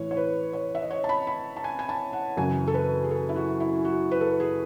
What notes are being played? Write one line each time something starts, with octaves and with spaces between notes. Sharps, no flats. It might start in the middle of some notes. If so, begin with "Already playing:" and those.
Already playing: A2 E3 B4 C#5
C#5
B4
C#5
E5
D#5
C#5
A5
B5
B5
A5
G#5
G#5
A5
F#5
F#2 C#3 E3 G#5
A4
B4
G#4
A4
E4
F#4
E4
F#4
B4
A4
G#4